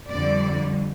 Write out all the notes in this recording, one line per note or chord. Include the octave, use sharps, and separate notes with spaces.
F2 D3 G3 D5